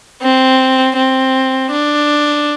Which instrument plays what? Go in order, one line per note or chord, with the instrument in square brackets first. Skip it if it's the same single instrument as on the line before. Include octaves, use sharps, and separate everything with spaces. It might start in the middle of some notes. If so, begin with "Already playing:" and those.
[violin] C4
C4
D4